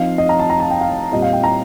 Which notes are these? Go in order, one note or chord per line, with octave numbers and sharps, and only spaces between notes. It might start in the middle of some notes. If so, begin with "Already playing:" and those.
Already playing: F3 C4 D#4 F5
D#5
A#5
A5
A#5
A5
G5
F5
A#2 G3 C4 F4 D#5
F5
G5
A#5